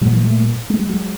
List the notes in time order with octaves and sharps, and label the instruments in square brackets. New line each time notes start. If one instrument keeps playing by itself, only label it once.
[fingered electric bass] A#2 F#3 G#3
E3 F#3
G3 A3
G#3
G3
F#3 G#3